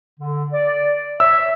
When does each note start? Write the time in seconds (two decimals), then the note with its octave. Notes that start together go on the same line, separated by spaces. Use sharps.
0.20 D3
0.53 D5
1.20 C#5 E5 E6